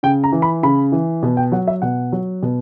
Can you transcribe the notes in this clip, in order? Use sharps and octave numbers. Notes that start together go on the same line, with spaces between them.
C#3 G5
A#5
E3
B5
C#3 B5
E3
B2
G5
F#3 F#5
E5
B2 F#5
F#3
B2